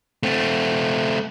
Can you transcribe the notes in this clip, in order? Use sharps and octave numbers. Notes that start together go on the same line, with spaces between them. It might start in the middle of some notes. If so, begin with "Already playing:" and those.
A3 C4